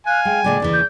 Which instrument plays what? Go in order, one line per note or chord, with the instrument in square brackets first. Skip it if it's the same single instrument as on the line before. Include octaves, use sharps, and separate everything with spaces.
[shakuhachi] F5 [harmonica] G#5 [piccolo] F#6
[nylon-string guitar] G#3 [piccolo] G5
[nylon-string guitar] A#2 D3 G#3 [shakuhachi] D5
[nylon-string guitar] D#2 C#3 E3
[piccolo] G6